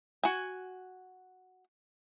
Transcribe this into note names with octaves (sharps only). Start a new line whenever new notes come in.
F#4 G#5